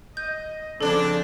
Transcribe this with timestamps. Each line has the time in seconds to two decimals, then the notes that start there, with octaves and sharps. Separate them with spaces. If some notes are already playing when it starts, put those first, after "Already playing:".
0.17 D#5 G6
0.81 C#3 F3 C4 D4 A4